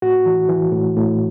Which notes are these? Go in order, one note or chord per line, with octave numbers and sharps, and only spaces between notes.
A2 F#4
E3
E3
A2
A2